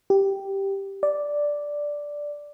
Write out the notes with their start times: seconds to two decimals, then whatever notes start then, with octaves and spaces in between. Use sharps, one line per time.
0.10 G4
1.03 D5